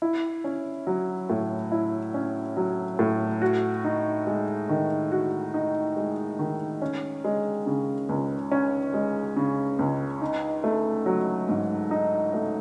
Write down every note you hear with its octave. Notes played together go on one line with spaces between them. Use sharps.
E4
C#4
F#3
A2
E4
C#4
F#3
A2
F#4
D#4
G#3
D#3
F#4
D#4
G#3
D#3
C#4
G#3
C#3
C#2
C#4
G#3
C#3
C#2
D#4
A3
F#3
G#2
D#4
A3